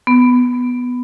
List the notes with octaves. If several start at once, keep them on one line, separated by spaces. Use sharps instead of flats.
B3